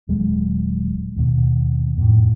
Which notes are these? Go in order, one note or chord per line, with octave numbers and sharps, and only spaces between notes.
D#1 F#3 G#3
D#2 B2
F2 A2